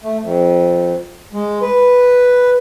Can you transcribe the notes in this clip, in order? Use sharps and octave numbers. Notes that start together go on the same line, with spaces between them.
A3
F2
G#3
B4